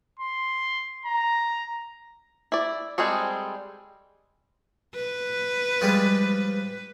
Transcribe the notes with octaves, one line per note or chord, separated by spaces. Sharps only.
C6
A#5
E4 D5
G3 G#3 C4 G#4 A4
B4
F3 G3 G#3